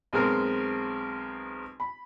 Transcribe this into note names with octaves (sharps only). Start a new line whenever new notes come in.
B1 G#3 C4 A#4
B5